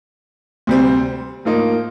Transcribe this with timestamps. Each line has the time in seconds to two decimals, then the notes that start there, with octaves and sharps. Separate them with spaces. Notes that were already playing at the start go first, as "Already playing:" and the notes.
0.67 D2 C3 G3 C4
1.45 A2 F3 A#3 D#4